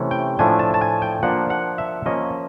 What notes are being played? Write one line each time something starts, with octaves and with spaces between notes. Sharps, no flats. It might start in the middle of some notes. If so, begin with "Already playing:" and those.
Already playing: C3 E3 A3 C#4
G5
A2 F3 A3 D4 G#5
A5
A5
G#5
G5
F3 A#3 D4 F#5
F#5
E5
F3 A#3 C#4 D#5